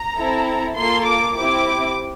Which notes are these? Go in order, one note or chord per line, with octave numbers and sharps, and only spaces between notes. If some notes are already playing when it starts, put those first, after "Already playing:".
Already playing: A#5
C4 E4 A4
A#3 F4 A4 C6
D6
C4 E4 G4 D6